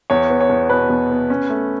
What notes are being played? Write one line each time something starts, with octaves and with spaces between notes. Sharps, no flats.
E2 C#5
B3
C#5
E2
B2 B4
E2
B3
C#4
A3